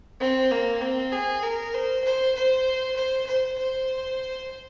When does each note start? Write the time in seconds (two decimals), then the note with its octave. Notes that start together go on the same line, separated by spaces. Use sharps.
0.20 C4
0.51 A#3
0.81 C4
1.12 G#4
1.43 A#4
1.74 C5
2.04 C5
2.35 C5
2.96 C5
3.27 C5
3.58 C5